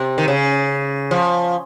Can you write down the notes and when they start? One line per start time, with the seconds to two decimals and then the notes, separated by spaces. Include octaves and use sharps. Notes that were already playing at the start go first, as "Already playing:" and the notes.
Already playing: C3
0.18 D#3
0.28 C#3
1.11 F3